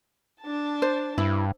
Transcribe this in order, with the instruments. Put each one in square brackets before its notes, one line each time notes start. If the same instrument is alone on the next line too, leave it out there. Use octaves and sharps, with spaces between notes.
[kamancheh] D4 A5
[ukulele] C5
[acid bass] G2 [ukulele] E4